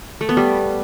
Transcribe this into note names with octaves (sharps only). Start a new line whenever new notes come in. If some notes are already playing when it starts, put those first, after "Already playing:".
A3
B3
G3